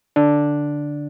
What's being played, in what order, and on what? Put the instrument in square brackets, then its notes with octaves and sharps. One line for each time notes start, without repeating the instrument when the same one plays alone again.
[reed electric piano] D3 D4